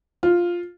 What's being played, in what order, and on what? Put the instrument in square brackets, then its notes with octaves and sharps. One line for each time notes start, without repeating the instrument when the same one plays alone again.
[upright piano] F4